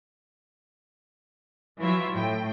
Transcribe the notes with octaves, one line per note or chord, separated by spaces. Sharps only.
E3 F#3 E4 F4 E5
A2 G5